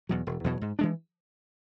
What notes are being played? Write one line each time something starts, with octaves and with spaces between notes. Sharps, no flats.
E2 B2 F#3
E1
E2 B2 F#3
G#2
E3 G#3 D4